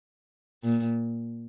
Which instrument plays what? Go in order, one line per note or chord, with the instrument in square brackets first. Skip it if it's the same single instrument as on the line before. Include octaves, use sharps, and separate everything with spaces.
[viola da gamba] A#2